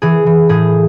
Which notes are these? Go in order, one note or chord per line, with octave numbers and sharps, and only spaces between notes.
E3 G#4
E3
A2 G#4